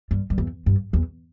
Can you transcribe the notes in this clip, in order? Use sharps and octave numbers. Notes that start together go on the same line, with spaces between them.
G2
G2
E2
G2
E2